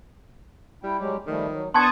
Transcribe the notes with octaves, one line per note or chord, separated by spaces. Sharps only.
G3 E4 G5
F#3 G#3 G4
D#3 F3 G3 A3
F#3
B3 D4 A5 C6 C#6 D#6 G#6